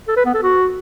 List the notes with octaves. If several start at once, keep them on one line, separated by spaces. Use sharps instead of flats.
A4
B4
B3
A4
F#4